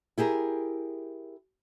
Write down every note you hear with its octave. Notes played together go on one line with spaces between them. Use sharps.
E4 G4 G#4 A#4